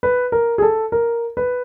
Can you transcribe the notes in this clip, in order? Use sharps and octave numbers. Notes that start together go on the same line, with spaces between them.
B4
A#4
G#4
A4
A#4
B4